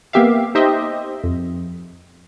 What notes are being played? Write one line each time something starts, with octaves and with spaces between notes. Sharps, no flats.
A#3 B3 G4 E5 F5
D#4 G4 C5 D#5 E5
F2